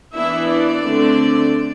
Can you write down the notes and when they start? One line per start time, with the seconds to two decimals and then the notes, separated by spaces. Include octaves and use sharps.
0.13 E3 B3 D4 E4 E5
0.48 D4 D5
0.84 D3 A3 C4